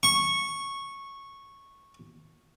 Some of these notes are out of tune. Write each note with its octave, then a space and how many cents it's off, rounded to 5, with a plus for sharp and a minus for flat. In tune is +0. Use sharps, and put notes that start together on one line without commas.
C#6 -10